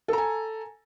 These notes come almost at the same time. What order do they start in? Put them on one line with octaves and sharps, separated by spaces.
A4 A#5 G#5